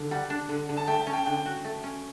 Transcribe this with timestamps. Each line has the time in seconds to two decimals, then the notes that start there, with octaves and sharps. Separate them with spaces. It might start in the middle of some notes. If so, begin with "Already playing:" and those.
Already playing: D3
0.11 G3 F#5
0.30 D4
0.49 D3
0.69 D3
0.77 A5
0.87 A3 G5
1.01 A5
1.07 C#4
1.13 G5
1.26 D3 G5
1.46 F#4
1.64 A3
1.84 C#4